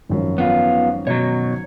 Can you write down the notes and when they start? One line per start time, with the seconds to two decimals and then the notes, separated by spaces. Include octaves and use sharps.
0.09 G#1 F#2 F3
0.38 B3 F4
1.07 B2 F#3 C#5